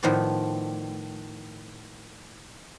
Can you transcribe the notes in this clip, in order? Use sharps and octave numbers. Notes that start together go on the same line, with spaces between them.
A2 D#3 F3 B3 D5